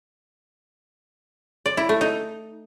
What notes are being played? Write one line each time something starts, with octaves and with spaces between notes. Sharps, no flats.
D5
E4
A3
D#4